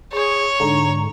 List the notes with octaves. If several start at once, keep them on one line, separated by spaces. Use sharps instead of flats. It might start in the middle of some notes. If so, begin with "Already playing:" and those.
G#4 C#5
G#2 D3 A#5